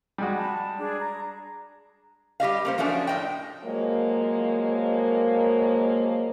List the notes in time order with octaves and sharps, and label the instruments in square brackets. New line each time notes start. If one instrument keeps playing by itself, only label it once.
[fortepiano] G3 G#3 F#4
[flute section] A5 B5
D4 G#4 D5
A#5
[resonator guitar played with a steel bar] G3 G4 D#5 F5
A#3 C#4 C5
F3 F#3 A3 C#4 D4
A2 D#5 G5
[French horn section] F3 F#3 G#3 A#3